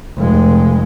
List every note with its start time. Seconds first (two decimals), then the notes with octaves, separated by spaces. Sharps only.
0.17 F1 G#3